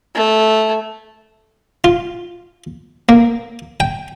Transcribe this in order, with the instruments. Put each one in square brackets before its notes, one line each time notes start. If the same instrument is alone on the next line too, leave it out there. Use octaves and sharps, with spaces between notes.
[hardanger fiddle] A3
[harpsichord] F4
A#3
G5